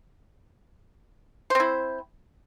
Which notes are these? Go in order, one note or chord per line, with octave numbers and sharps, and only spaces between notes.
C4 E4 C5